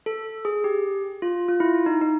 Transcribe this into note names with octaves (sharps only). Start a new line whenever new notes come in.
A4
G#4
G4
F4
F4
E4
D#4
D#4